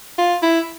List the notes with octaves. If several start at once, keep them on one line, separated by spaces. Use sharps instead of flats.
F4
E4